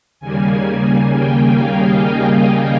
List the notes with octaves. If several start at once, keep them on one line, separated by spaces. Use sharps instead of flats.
D#2 C#3 G3 A#3 G#5
G5
F5
D#5
G5
D#5